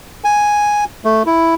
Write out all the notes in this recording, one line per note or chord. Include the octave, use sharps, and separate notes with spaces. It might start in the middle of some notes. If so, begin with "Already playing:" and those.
G#5
A3
E4